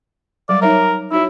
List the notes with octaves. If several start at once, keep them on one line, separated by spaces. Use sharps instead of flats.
F#3 G3 D5
D#4 A#4 C#5 E5
D#4 E4 F#4 C#5